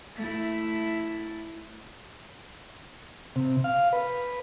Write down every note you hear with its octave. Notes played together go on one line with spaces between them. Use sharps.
A3 E4
C3
F5
B4